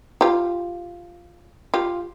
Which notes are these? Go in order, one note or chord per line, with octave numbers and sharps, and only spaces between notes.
F4 G4
F4 G4